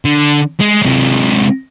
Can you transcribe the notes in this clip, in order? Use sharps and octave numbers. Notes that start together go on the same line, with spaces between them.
D3
G#3
C3 G#3